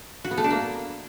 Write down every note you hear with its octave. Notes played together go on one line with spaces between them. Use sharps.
F#4
B3
A3
D4
A#3